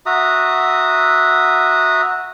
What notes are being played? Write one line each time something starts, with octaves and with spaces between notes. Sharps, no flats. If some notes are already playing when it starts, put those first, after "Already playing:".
F#4 E5 A#5 D#6